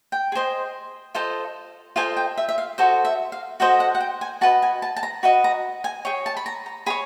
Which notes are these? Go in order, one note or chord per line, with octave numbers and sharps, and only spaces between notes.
G5
G#4 C5 D#5
F4 A4 C5 D#5
F4 A4 C5 D#5 G#5
G5
E5
E5
F5
F#4 A4 C5 D#5
E5
F5
F#4 A4 C5 D#5 F#5
F#5
F#5
G5
G#5
F#4 B4 D#5 A5
G#5
A5
A5
A#5
F#4 B4 D#5 B5
A#5
G#5
G#4 C#5 G5
A5
B5
A#5
A#5
G#4 C#5 B5